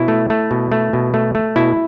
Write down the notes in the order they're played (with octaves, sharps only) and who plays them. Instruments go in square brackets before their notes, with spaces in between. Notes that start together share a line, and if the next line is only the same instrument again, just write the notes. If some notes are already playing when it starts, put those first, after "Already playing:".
Already playing: [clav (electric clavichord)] B2 E4
A3
A3
B2
A3
B2
A3
A3
B2 E4